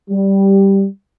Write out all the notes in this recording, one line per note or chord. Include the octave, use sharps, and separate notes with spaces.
G3